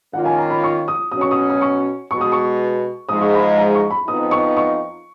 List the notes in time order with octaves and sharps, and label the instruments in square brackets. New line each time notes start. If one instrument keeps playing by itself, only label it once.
[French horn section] D#3 A#3 C#4 F4 [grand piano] F#5
[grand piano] G#5
A#5
B5
C#6
D#6
[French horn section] B2 F#3 C#4 [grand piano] D#6
[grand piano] C#6
D#6
D#6
C#6
[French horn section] B2 G#3 B3 [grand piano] C#6
[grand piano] D#6
C#6
[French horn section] G#2 F3 G#3 D#4 [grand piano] D#6
[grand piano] C#6
B5
A#5
C#6
B5
[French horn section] F2 F3 B3 D#4 [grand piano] D#6
[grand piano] C#6
C#6